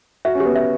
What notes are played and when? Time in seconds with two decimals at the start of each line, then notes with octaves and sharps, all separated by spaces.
0.25 F#4 E5
0.35 C#4
0.40 G4
0.46 B3
0.56 E5